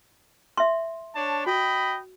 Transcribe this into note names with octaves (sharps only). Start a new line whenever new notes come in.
E5 C6
D4 C#5 A5
F#4 D#5 G5 B5